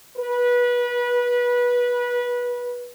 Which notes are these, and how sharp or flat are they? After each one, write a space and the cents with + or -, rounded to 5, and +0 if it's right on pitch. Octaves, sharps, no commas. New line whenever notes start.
B4 -20